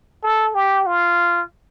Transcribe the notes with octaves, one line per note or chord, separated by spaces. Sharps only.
A4
G4
F4